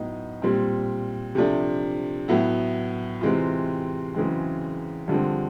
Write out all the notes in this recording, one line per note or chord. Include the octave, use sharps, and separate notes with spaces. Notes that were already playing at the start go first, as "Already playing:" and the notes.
Already playing: A2 F#3 B3 D#4
A#2 G3 C4
C3 F3 A3 D4
A2 F#3 B3 E4
C3 E3 G#3 C4 F4
F#2 C#3 E3 G#3 C4
G2 D3 F3 G#3 C4